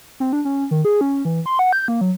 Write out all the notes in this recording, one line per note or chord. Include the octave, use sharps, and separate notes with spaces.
C4
D4
C#4
D#3
G#4
C#4
E3
C6
F#5
G6
A#3
F#3